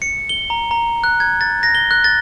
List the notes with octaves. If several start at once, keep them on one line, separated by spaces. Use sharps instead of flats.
C#7
G7
A#5
A#5
F#6
G#6
A6
A#6
G7
F#6
A6